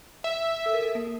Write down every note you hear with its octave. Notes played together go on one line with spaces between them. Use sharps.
E5
A4
A#4
A4
A#3